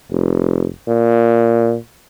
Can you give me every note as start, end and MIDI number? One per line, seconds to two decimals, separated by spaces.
0.11 0.67 29
0.88 1.75 46